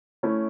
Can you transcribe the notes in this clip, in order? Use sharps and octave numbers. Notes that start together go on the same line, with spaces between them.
A3 C#4 E4